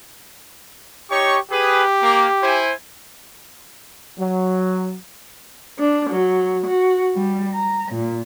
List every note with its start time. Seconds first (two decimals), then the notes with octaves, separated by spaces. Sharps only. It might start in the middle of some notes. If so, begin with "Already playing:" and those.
1.11 D#4 G4 C#5 C#6
1.51 G4 G#4 B4
2.02 A#3
2.43 E4 C5 G#5
4.19 F#3
5.80 D4
6.10 F#3
6.68 F#4
7.16 G3
7.55 A#5
7.92 A#2